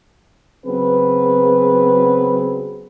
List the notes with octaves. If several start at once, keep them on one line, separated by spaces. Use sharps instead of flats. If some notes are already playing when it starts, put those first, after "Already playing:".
C#3 F#3 B3 C4 G#4 B4